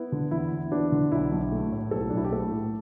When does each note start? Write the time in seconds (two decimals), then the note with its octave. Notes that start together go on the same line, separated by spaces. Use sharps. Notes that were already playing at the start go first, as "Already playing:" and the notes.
Already playing: B3 E4
0.12 D3
0.31 E2 E4
0.51 E2
0.72 B3 D4
0.92 D3
1.12 B1 E4
1.31 B1
1.52 A3
1.72 A2
1.91 B1 A4
2.10 D4
2.13 B1 E4
2.24 G4
2.32 A3 A4
2.52 A2